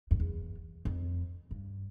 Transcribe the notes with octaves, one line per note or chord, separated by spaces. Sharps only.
F2
E2
F2
G2